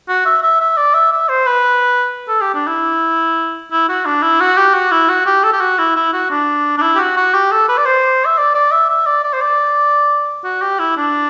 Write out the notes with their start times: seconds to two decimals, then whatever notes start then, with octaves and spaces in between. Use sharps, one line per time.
0.09 F#4
0.26 E5
0.43 E5
0.61 E5
0.77 D5
0.94 E5
1.13 E5
1.29 C5
1.46 B4
2.28 A4
2.41 G4
2.55 D4
2.67 E4
3.71 E4
3.89 F#4
4.05 D4
4.23 E4
4.41 F#4
4.58 G4
4.74 F#4
4.92 E4
5.09 F#4
5.26 G4
5.44 A4
5.53 G4
5.61 F#4
5.79 E4
5.96 E4
6.13 F#4
6.31 D4
6.78 D4
6.82 E4
6.95 G4
6.99 F#4
7.17 F#4
7.34 G4
7.52 A4
7.69 B4
7.78 D5
7.86 C5
8.26 E5
8.38 D5
8.55 D5
8.72 E5
8.90 E5
9.06 D5
9.24 D5
9.33 C5
9.41 D5
10.45 F#4
10.62 G4
10.80 E4
10.97 D4